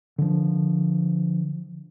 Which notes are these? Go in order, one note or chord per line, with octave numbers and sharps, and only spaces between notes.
D3 F3